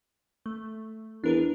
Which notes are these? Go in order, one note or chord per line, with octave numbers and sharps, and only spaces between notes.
A3
E2 D4 A#4 B4